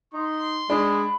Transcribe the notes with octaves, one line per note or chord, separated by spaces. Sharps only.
D#4 C6
G#3 D4 B5